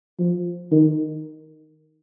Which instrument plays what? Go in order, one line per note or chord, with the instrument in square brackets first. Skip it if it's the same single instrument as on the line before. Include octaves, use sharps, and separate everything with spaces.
[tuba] F3
D#3